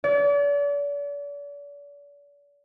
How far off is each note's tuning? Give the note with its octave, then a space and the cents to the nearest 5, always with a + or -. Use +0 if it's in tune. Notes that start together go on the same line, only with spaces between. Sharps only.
D5 -40